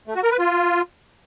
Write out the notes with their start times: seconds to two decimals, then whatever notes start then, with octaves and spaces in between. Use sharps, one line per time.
0.07 A3
0.15 F#4
0.23 A#4
0.31 B4
0.39 F4